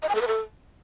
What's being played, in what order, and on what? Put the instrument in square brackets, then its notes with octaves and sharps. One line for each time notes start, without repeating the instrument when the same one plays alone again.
[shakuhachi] D#5
G#5
A4
B4
A4